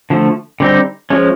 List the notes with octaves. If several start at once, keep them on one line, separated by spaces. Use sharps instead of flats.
D3 F3 A3
D3 G3 C4 D#4
F3 G#3 C#4